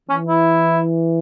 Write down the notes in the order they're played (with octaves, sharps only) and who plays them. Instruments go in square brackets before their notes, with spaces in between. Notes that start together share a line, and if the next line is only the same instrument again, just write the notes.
[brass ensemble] E3 [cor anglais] C#4
[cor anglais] E4